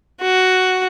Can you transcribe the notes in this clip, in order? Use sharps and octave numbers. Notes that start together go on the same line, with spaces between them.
F#4